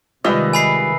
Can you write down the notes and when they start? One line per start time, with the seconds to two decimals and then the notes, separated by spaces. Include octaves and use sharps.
0.24 C3 D#3 G3 G#3 F4 B4 D#5 E5
0.53 G#5 B5 C7